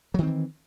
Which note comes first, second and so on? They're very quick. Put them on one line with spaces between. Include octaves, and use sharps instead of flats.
F#3 D#3 C4 E3